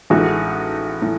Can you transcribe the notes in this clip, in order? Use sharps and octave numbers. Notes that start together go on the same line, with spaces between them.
A1 A2 G#3 D#4 F#4
A2